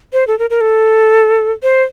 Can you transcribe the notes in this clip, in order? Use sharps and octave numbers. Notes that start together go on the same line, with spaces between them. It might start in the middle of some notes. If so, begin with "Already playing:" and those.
C5
A4
A#4
A#4
A4
C5